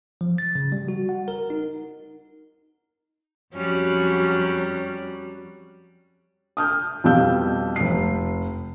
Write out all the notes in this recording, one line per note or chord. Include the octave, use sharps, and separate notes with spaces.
F3
A6
C#3
G3
F#4
F#5
A#4
D#4
F2 F#3 G3 C#4
D#6 F6 G6
F2 B2 G3 F5 E6 G6
F1 C7